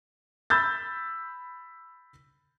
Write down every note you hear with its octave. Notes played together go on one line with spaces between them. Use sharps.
B5 E6 G6 A6